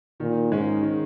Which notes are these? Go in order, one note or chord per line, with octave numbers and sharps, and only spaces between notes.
A#2 D#3
G#2 G#3 C#4
D#3